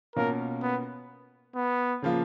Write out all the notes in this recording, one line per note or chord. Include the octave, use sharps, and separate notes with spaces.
B2 A#3 C#4 F4 A#4
B3
B3
C#3 F3 A#3 F4